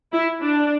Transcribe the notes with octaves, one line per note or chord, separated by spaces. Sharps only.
E4
D4